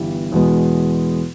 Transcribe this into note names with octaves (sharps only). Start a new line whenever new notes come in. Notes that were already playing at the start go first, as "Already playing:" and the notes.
Already playing: G1 G2 E3 G3 B3
E2 B2 G#3 B3